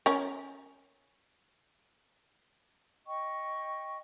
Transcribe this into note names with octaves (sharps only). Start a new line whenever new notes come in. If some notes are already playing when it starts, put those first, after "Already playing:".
C#4 A#4
D#5 G5 C#6